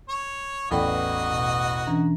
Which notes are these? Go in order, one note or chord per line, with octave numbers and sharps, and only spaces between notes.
C#5
A1 E2 F#4 A4 D5 D#5 G5 B5
B2
E3 C#4 D4 A#5